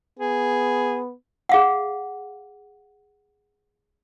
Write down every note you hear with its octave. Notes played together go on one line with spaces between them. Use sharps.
B3 G#4
G#4 F5 F#5